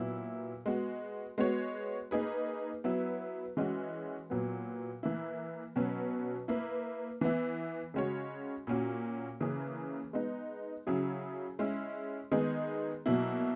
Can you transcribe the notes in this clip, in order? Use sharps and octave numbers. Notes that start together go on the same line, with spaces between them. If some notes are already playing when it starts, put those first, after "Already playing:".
Already playing: A#2 F#3 B3 E4
G#3 B3 F#4
G#3 B3 F#4 C#5
A#3 D#4 G#4 B4
F#3 B3 E4 B4
E3 G#3 C#4 F#4
A#2 F#3 B3
E3 A#3 E4
B2 F#3 C#4 F#4 B4
A#3 E4 B4
E3 B3 E4
C#3 G#3 C#4 F#4 C#5
A#2 A#3 C#4 F#4
C#3 E3 A#3 C#4 G#4
G#3 B3 D#4
C#3 F#3 C#4 E4 G#4
G#3 C#4 E4
D#3 G#3 B3 D#4 G#4
B2 F#3 A#3 E4